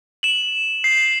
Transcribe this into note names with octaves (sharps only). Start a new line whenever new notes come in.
E7 F#7
C7